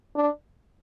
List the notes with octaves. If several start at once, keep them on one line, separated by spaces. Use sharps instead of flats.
D4